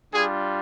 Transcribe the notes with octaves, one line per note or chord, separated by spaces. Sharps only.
G3 D4 F4 G#4 G#5